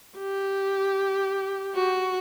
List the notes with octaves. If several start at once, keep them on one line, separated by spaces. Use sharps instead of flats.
G4
F#4